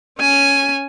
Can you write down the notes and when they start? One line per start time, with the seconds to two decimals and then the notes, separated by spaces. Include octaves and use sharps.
0.19 C#4 G#5